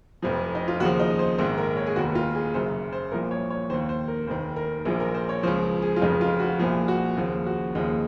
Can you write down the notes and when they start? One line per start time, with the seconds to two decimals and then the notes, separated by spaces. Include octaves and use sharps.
0.22 F1 F2 C3 F3
0.55 D#4
0.68 F4
0.80 D#2 C#3 F3 F#4
1.00 D#4
1.19 C5
1.38 A#1 G#2 D#3 C5
1.58 A#4
1.77 C#5
1.86 G#4
1.96 F1 D#2 D#3 F#4
2.15 F4
2.35 G#4
2.54 F#1 F#2 C#3 C5
2.93 C5
3.12 C2 A#2 F3 A#4
3.31 C#5
3.50 C#5
3.70 D#3 C5
3.74 D#2
3.89 C5
4.08 A#4
4.27 F1 D#2 D#3 C5
4.56 A#4
4.85 A#1 A#2 F3 G#4
5.00 A#4
5.15 C5
5.29 C#5
5.43 C#2 C#3 F3 C5
5.82 G#4
5.96 F4
6.01 F1 F2 C#3 F3 D#4
6.21 F4
6.40 F#4
6.59 C2 A#2 F3 G#4
6.88 F#4
7.17 D#2 C#3 F3
7.46 F#4
7.75 D#2 C#3 F3 D#4